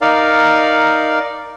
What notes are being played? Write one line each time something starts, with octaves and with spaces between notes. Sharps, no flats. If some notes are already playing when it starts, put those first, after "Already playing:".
D#4 A#4 D5 F5